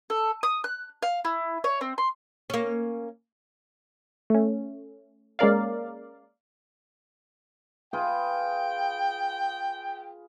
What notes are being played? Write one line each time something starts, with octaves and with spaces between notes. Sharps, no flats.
A4
D#6
F#6
F5
E4
C#5
C4
C6
A#3 C#4
A3 C#4
G#3 A#3 C#4 A#4 D5 F5
F4 G#4 B4 G5